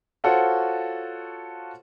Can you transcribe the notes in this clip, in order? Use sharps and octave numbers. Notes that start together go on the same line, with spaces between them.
F4 F#4 A4 C5 C#5 F#5